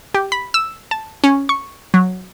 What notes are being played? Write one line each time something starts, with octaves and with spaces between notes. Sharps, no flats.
G4
B5
E6
A5
C#4
C#6
F#3